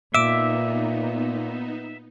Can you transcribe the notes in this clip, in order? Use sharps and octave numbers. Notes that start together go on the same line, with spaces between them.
A#2 B3 D#4 E5 D6 E6 D7